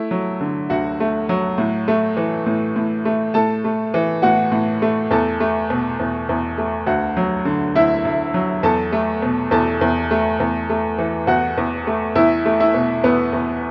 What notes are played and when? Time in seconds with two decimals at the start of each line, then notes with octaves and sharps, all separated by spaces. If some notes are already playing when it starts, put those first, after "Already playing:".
Already playing: A3 E4
0.11 F#3
0.41 D3
0.70 D2 F#4 F#5
1.00 A3
1.29 F#3
1.58 A2
1.88 A3
2.17 E3
2.46 A2
2.76 A2
3.05 A3
3.34 A2 A4 A5
3.64 A3
3.94 E3
4.22 A2 F#4 F#5
4.52 A2
4.82 A3
5.11 E2 A4 A5
5.40 A3
5.70 B2
6.00 E2
6.29 E2
6.58 A3
6.87 D2 F#4 F#5
7.17 F#3
7.45 D3
7.75 D2 E4 E5
8.05 D2
8.34 F#3
8.63 E2 A4 A5
8.92 A3
9.22 B2
9.51 E2 A4 A5
9.81 E2
10.11 A3
10.40 E2
10.70 A3
10.99 E3
11.27 E2 F#4 F#5
11.57 E2
11.87 A3
12.15 E2 E4 E5
12.46 A3
12.60 E4 E5
12.74 B2
13.04 E2 B3 B4
13.33 E2